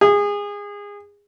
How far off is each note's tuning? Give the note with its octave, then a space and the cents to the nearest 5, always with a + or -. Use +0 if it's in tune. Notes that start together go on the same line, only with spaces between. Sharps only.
G#4 -25